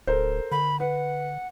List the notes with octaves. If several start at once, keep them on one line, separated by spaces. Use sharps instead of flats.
D1 A4 A#4 C5
D3 B5
B4 F#5